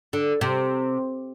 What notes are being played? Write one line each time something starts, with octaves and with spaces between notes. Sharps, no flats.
D3
C3